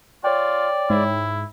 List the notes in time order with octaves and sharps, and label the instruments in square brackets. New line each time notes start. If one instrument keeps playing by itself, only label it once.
[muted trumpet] F4 [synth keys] C#5 G5 [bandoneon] D5
[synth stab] G#2 [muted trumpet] E4